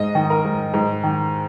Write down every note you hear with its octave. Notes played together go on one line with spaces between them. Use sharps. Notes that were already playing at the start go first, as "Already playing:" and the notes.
Already playing: G#2 D#5
D#3
A#4
G#2
G#2
D#3